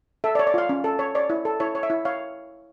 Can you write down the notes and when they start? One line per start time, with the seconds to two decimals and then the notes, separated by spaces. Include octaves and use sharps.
0.24 A4 E5
0.35 D5
0.39 C#5
0.47 D5
0.54 F4 F5
0.69 C#4
0.84 A4
0.99 C#5
1.15 C#5 D5
1.30 E4
1.45 A4
1.60 E4 C#5
1.75 C#5
1.83 E5
1.90 E4
2.05 C#5 F5